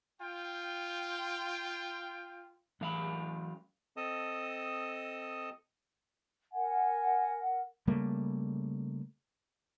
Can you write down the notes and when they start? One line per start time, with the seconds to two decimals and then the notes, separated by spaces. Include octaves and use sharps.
0.21 F4 G5
2.81 F#2 E3 A3 F5 B5
3.97 C4 A4 D#5 A5 D#6
6.54 A#4 F#5 G#5
7.87 C#3 G3 A3 A#3